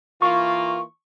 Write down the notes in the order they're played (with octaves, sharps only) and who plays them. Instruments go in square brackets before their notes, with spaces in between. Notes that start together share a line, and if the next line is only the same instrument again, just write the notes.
[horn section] E3 A#3 F4 [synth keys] C#6